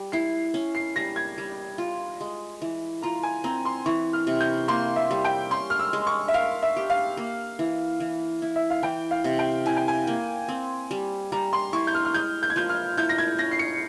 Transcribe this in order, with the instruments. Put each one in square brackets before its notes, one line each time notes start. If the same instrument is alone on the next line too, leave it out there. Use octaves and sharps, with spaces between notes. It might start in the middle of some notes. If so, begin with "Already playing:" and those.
Already playing: [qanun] G3
[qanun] E4 [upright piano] C7
[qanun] C#4
[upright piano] C7
[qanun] G3 [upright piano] A#6
[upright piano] G#6
[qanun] G3
F4
G#3
E3
[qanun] F4 [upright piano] A#5
[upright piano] G#5
[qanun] C4 [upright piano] A#5
[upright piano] C6
[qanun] E3 [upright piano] C#6
[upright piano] F6
[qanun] C3
[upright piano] G6
[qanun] A#3 [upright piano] C6
[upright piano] E5
[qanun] G3
[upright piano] G5
[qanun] C#4 [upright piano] C6
[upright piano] F6
E6
[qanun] G#3
[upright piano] C#6
E5
[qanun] A#4 [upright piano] F5
[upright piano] E5
[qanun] G4
[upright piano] F5
[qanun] A#3
E3
E3
E4
[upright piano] E5
F5
[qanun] E3 [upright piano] G5
[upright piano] F5
[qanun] C3
[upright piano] G5
[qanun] E4 [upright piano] G#5
[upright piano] G5
G#5
[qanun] A#3
C4
G3
[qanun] G3 [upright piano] A#5
[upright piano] C6
[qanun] E4 [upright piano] C#6
[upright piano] G6
F6
F6
[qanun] G#3 [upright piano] G6
[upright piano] G6
G#6
[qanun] F3 [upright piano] G6
[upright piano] F6
[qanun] E4 [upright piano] G6
[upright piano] A#6
G#6
[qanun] C#4 [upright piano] A#6
[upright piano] C7
C#7